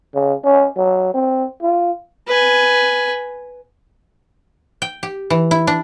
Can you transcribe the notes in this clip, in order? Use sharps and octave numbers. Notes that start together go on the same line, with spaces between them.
C#3
C#4
F#3
C4
F4
B4 G#5
G5
G4
E3
E4
D4